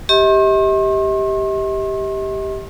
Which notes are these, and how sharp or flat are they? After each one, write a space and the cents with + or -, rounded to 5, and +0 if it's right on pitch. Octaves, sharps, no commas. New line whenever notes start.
G4 +0 D#5 +45 C6 +45